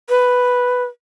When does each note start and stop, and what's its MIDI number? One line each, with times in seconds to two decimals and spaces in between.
0.09 0.84 71